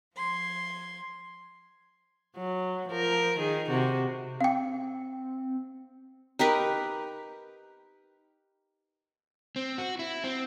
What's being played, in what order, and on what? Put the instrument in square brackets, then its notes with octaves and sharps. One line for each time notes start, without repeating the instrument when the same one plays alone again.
[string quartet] F3 C6 G#6
[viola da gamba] F#3
F3 A#4
D#3 G#4
C3 F#4
[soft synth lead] C4 [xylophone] F5 G5
[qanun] D#4 G4 A#4 B4
[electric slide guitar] C4
F#4
E4
C4